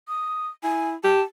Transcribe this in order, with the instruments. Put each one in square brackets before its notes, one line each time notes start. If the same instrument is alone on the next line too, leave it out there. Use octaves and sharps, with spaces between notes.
[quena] D#6
[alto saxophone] E4 [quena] G#5
[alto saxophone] G4 [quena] A5